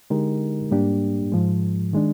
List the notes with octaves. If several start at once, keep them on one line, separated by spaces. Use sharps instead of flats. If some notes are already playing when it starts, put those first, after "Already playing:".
D3 G#3 D#4 G4 A#4
G#2 G3 A#3 D4 G4
G#2 F3 G#3
D#3 G#3 D4